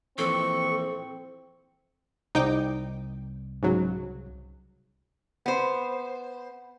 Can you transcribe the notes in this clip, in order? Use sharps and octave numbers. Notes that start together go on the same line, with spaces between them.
F2 A#2 E3 C4 A4 C#6
C2 D#4 G5 D6
G#2 C#3 F#3
B3 C5